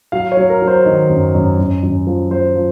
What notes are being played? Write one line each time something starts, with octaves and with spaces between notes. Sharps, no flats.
F#3 F5
C#5
F#3
A#4
F#3
C5
D#3 D#5
F#2
F#2
F#2
F#2
F3
F3 C5
F3